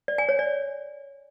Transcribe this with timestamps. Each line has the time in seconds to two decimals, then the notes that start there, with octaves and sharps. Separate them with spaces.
0.08 D5
0.18 G#5
0.29 C#5
0.39 D5